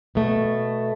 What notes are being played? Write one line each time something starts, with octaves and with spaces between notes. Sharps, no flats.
B2 A3